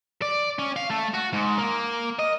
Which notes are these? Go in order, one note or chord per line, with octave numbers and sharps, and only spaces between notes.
D5
C#4
F5
A3
F#4
G#2
A#3
D#5